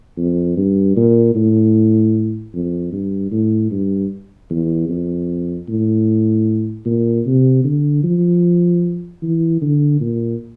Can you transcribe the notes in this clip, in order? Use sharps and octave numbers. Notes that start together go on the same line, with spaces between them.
F2
G2
A#2
A2
F2
G2
A2
G2
E2
F2
A2
A#2
C3
D3
F3
E3
D3
A#2